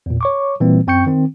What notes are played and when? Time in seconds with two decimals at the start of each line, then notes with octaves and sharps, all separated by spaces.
0.06 E2 A#2
0.21 C#5 C#6 D6
0.60 A#2 E3 G3 A#3 C4
0.87 F#2 C4 G5 C#6 G6 C#7
1.06 D#3 C4